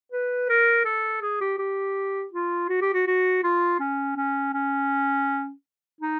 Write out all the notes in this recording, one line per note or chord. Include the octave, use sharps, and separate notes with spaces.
B4
A#4
A4
G#4
G4
G4
F4
F#4
G4
F#4
F#4
F4
C#4
C#4
C#4
D#4